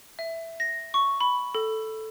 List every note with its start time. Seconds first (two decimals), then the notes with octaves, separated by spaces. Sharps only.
0.19 E5
0.60 A#6
0.94 C#6
1.21 B5
1.55 A4